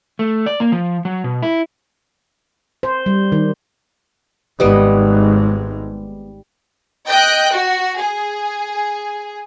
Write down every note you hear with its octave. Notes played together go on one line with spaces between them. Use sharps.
A3
D5
A#3
F3
F#3
B2
E4
C5
G3
D#3
G#1 G#2 G3 B3 D#5
D#5 G5 F#6 G6
F#4
G#4